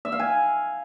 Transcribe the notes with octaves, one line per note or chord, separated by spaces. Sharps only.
E5
F5
G#5